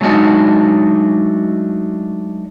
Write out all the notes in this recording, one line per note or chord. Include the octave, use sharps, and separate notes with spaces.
F#3 G#3 A3 D4 D#4 F#4